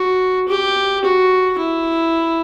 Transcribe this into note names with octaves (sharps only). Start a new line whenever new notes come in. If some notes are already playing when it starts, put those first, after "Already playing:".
Already playing: F#4
G4
F#4
E4